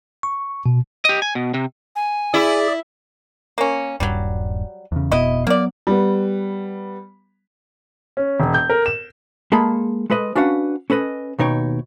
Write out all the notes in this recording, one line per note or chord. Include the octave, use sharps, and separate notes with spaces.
C#6
B2
G4 D#5
G#5
B2
C3
G#5
E4 G#4 D5
A#3 C#4
D#1 G2 F#3 G3
E2 C#3
F1 B2 B3 E4 D#5
F#3 A#3 B3 D5
G3 B3
C#4
E1
G6
A#4
E7
G#3 A#3 G#4 A4 A5 B5
G#3 A4 B4 D#5
C#4 D4 F#4 B4 F5 F#5
C#4 A4 B4 D#5
D#2 B2 D#4 C#5 G5